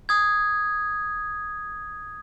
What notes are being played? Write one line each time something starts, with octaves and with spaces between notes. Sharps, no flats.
D#6 G#6